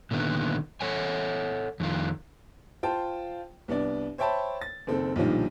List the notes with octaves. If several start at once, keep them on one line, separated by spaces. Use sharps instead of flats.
A#2 D3 D#3 B3
A4 C#5 F#5 G#5
F2 D#3 F4
F4 C5 G5 A5
C2 B3 D4 D5
C5 C#5 E5 G5 A5 B5
A6
F#1 D#3 C4 A4
B1 A#2 D3 D#3 F3 G3